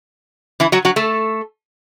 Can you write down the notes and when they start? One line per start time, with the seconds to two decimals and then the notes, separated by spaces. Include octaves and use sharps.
0.60 E3 E4
0.72 F#3 F#4
0.85 F#3 F#4
0.96 A3 A4